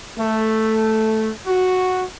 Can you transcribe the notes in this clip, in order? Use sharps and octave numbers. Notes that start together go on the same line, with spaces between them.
A3
F#4